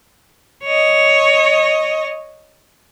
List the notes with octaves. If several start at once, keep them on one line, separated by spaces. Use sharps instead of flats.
C#5 D#5